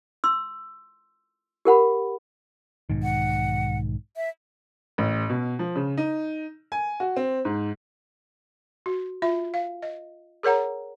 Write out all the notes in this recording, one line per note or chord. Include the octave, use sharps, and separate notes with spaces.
C6 E6
G4 A#4 F#5 B5
B1 G#2 D#3
F#5
E5
A1
B2
F3
C#3
D#4
G#5
F#4
C4
G#2
F#4
F4 E5
F5
D#5
G#4 A#4 C#5 F#5 A#5